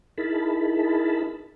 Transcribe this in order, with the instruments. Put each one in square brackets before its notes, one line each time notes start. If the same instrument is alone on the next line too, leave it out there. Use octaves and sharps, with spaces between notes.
[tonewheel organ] D#4 E4 G#4 A#4 A5 B5